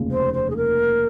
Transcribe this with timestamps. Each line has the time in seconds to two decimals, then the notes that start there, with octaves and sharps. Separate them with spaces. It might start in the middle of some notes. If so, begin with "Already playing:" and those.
Already playing: F1 D#2 C#3 F3 G#3
0.11 C5
0.34 C5
0.50 G#4
0.56 A#4